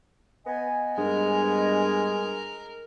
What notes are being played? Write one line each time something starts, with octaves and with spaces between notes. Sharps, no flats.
B3 D#5 G#5
G2 G#3 A#4